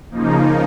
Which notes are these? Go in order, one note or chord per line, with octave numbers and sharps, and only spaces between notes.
C#3 F3 A#3 D#4